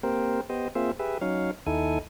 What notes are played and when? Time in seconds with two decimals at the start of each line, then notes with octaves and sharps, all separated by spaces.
0.03 A#3 C4 G4 A#4 C5
0.50 B3 G4 C5 D#5
0.75 A#3 C4 F4 G#4 C5 E5
0.99 G4 G#4 B4 E5
1.21 F#3 C#4 D#4 C#5 F5
1.66 D#2 D#4 E4 A4 G#5